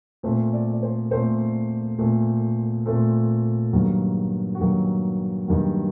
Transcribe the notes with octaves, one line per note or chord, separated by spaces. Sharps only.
A#2 A3 C4 C5
D5
D5
C5
A#2 A3 C4 C5
A#2 A3 C4
A#2 A3 C4 A4
G2 D#3 F#3 A#3
F#4
G2 D#3 F#3 A#3 G4
G2 D#3 F#3 A#3